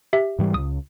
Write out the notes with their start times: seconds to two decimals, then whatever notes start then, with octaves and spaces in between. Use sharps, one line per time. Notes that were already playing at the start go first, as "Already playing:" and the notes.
0.13 G4 E5
0.39 G#2 E3 G3
0.54 C#2 C#3 D#6